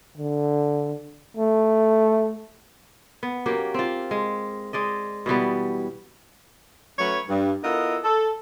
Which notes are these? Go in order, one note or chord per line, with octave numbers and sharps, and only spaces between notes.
D3
A3
B3
F#3 A#3 C#4 G4
C4 F4
G#3
G#3 D5 D#5
B2 E3 G3 B3
F#3 A3 C#4 B4 C#5
G2
B3 E4 F4 A4 A#4 D#5
A4